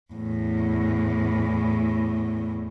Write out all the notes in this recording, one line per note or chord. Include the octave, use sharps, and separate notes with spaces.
E2 A2